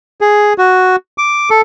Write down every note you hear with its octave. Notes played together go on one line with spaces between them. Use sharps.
G#4
F#4
D6
A4